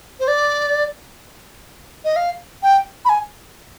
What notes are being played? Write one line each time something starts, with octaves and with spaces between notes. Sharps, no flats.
C5
D5
D#5
F5
G5
B5
G#5